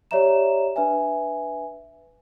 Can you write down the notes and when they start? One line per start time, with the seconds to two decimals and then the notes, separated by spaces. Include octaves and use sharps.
0.11 G4 C#5 D5 E5 A#5 E7
0.76 D4 B4 E5 G#5